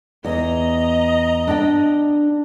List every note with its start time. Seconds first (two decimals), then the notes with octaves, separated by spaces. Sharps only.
0.25 E2 D#5 A#5
1.48 D4 G5